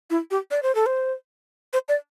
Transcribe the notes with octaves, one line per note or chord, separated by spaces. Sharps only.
E4
G4
D5
C5
A4
C5
C5
D5